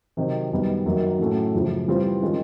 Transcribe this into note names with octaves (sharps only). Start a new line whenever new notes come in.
C3 D#3 F#3
F#2 D#3 G3 B3 D#4
F#2 D#3 F#3 A#3
A2 F#3 A3 C#4
F#2 C#3 F3
E3 G3 C4 F4
D#3 G#3 C#4 F4